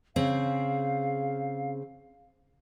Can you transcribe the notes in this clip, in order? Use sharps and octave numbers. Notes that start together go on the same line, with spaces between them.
C#3 C4 G#4 F5